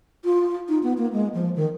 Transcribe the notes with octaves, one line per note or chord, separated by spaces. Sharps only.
F4
D#4
B3
A#3
G#3
F3
D#3